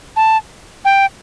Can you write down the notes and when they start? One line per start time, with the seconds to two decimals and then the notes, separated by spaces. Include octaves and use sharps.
0.16 A5
0.85 G5